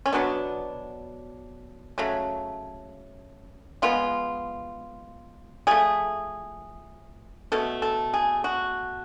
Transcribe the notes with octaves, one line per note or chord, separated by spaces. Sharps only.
C#4
B2 F#3 B3 D4
C#3 F#3 A3
F3 G#3 B3 F4
F3 A3 G#4
B2 A3 A4
A4
G#4
F#4